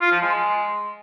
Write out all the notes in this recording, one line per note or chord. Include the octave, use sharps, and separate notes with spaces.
F4
F3
G#3